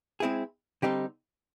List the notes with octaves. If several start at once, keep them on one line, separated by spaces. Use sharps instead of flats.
G#3 C4 E4 G#4
D3 G3 C4 D#4 G4